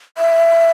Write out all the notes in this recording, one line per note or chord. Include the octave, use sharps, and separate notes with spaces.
E5